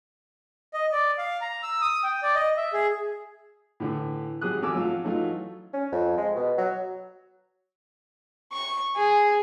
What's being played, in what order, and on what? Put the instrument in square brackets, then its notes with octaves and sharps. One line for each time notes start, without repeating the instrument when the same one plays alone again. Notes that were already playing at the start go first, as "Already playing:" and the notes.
[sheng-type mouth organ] D#5
D5
F5
A#5
E6
D#6
G5
D5
D#5
E5
G#4
[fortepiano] A2 D3 E3
G#1 F#3 G4 G#4 D#6 F#6
G#1 A4 G#5 D6 E6
F#3 A3 F4
E3 F#3 A3 D#4 F4
[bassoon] C#4
F2
G#3
B2
F#3
[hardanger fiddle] C#6
G#4